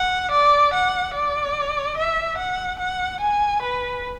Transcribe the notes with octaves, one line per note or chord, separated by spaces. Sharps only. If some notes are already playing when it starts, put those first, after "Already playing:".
Already playing: F#5
D5
F#5
D5
E5
F#5
F#5
G#5
B4